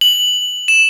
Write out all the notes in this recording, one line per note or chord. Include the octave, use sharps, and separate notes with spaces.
F#7
E7